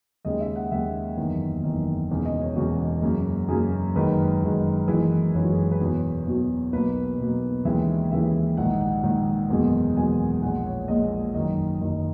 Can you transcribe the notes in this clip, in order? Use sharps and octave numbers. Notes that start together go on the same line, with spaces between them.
D#2 C#3 G#3 D#5
E5
F#5
D#2 C#3 G#3 E5
F#1 E2 D#3
F#1 E2 D#3
E1 E2 C#3
D#5
C#5
E1 E2 C#3 F#4
F#2 C#3 F#3 A#3
F#2 C#3 F#3 A#3 G#4
F#1 F#2 D#3 G#3 B4
F#1 F#2 D#3 G#3
F#1 F#2 E3 G#3
F#1 F#2 E3 G#3 C#5
F#4
G#4
A#4
B4
E2 B2 F#3 C#5
E2 B2 F#3
B1 B2 A#3 B4
B1 B2 A#3
D#2 C#3 E3 G#3 E5
D#2 C#3 E3 G#3 E5
A#1 G#2 D#3 F#5
F#5
A#1 G#2 D#3
F#1 E2 B2 G#3
F#1 E2 B2 G#3 G#5
A#1 A#2 G#3 F#5
C#5
A#1 A#2 G#3 D#5
F#1 F#2 D#3 D#5
F#1 F#2 D#3